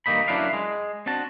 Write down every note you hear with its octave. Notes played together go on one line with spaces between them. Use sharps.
G2 D#3 A#3 D#4 B5
F#2 D4 E4 B4 D5 F5
G#3
C4 D4 F#4 A5